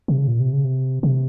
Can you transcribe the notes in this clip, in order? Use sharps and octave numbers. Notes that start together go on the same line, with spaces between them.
C3
C#3
A#2
C3
C#3
C3
C3